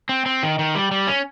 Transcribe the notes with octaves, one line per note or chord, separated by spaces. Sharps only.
C4
C4
D#3
D#3
G3
G3
C#4